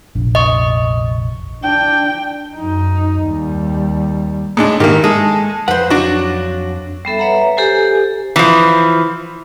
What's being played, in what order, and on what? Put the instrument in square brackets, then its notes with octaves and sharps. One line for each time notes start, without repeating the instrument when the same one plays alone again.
[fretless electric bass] F1 A#1 D4
[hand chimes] D#5 C#6
[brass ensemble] D4 [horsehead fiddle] G5
[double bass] F#2 D#4
D#2 G3
[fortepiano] A2 G#3 D4
[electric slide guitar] G#2 [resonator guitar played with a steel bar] D#3 E3 [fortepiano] A#3 G4
[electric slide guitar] G#3 [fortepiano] G#4 [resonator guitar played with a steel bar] A4
[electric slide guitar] F2 F#5 [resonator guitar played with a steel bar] B4 C5
[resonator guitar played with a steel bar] F#3 [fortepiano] D4 F#4
[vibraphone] G3 B3 A4 E5
B4 C#5 E5 F#5 A#5
G4 A4 C5 G#5
[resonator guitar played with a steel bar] E3 F3